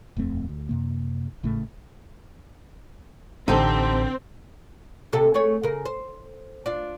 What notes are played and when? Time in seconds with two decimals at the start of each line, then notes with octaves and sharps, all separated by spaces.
0.17 D#1 F2 A3 C4
0.49 D2
0.69 F#2 C3 A#3
1.43 G#1 A2 C#3 A3
3.48 A1 D3 C4 D#4 G4 A4
5.12 D#2 C3 A4
5.34 A3 G#4 C#5
5.63 C#3 A#4
5.86 C5
6.66 D4 F4